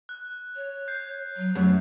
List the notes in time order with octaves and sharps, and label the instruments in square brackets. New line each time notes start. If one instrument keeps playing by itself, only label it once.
[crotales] F#6
[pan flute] C#5
[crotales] G6 C7
[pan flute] F#3
[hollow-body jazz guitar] F#2 [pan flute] A3